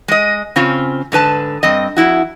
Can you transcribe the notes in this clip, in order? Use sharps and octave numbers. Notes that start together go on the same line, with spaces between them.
G#3 D#5
C#3 C4 C#4 F4
G#2 D3 B4 A5
G2 C4 D#5
F2 C#3 E4 F#4